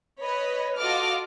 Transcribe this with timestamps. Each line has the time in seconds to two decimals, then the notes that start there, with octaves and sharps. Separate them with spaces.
0.20 B4 C#5 D#5 B5
0.78 F4 F#4 A4 D#5 D6 F6